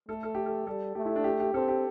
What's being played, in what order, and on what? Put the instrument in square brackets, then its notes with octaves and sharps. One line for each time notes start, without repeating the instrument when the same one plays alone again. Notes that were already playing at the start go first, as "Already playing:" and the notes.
[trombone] A3 [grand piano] A4
[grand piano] A4
G4
A4
[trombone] G3 [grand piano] A4
[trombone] A3 [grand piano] G4
[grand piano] E4
D4
G4
G4
[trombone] C4 [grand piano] A4
[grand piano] G4